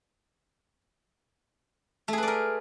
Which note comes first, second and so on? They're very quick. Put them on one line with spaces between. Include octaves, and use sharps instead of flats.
A3 G#4 B4 D5 A#4